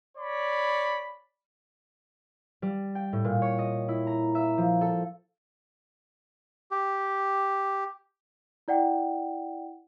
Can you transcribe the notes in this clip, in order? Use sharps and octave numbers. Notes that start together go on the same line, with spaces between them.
C#5 D5 B5
G3
G5
A2
A#2
C#5
D#5
E4
A#5
E5
F3
A4
G4
E4 D5 F#5 G5